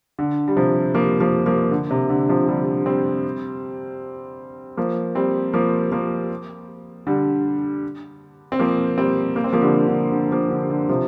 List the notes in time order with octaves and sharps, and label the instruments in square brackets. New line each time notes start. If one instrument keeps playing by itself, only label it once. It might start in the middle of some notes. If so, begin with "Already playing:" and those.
[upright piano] D3
G3
C3 F3
F3 A#3
F3 A#3
F3 A#3
D3
C3
D3
C3 F3
D3 G3
G3 C4
F3 A#3
G3 C4
F3 A#3
F3 A#3
D3 G3
C4
F3 A#3
G3 C4
A#3
C4
F3 A#3
D3 G3
D3
D3
F3 A#3
D3
D3
C3 F3